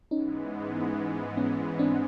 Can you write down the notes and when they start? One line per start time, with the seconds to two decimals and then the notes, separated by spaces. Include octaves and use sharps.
0.11 G#2 E3 G#3 B3 C#4 D#4
1.37 B3 C#4
1.79 C4 D4